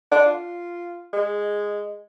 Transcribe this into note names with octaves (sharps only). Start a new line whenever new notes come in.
D4
F4
G#3